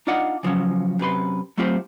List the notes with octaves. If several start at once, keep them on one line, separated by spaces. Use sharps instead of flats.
D4 D#4 F4 D5 D#5 F#5
C#3 F3 F#3 C#4
F#2 C3 B4 C6
F#3 A3 C4 F4 G4 C5